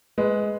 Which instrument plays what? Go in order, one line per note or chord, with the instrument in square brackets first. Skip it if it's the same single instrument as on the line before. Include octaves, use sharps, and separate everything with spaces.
[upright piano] G#3 B4